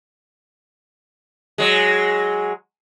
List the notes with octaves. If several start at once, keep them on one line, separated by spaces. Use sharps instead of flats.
F#3 G#3